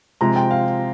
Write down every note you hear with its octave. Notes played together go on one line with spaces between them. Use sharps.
C3 F3 G#3 C4 A#5
G5
F5